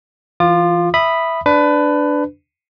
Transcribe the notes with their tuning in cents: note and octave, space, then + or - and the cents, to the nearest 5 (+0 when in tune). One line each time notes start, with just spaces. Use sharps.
E3 +30 F4 +0 D6 +45
E5 +0 B5 +0 D#6 -15
D4 +0 B4 +20